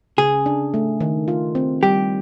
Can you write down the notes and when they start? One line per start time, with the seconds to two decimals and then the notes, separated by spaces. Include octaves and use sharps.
0.18 C#3 G#4
0.46 D4
0.74 A3
1.01 D#3
1.28 F4
1.55 C4
1.83 G3 G4